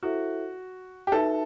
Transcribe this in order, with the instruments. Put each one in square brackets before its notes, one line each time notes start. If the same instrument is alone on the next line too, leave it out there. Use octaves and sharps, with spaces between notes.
[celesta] E4 A4 C5 E5 [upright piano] F#4
[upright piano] G4
[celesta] D#4 F#4 B4 E5 A5 [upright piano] A4